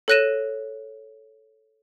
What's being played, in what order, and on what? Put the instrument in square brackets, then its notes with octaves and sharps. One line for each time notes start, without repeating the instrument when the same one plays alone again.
[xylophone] A4 C#5 F#6 A#6 D#7 E7